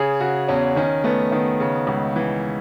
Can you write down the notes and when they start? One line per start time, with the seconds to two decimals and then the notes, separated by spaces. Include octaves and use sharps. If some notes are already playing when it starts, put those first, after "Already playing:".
Already playing: C#3 G#4
0.20 C#3 F#4
0.48 E2 C#4
0.76 D#3 C#4
1.04 A3 B3
1.31 D#3 B3
1.60 C#3
1.87 C#2
2.16 E3